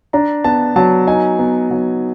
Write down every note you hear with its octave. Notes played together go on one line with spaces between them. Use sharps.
D4 A#5
B3 A5
F#3 A5
D#4 G#5
B3
F#3